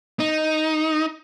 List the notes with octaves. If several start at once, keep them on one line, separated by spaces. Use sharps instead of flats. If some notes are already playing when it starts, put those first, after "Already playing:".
D#4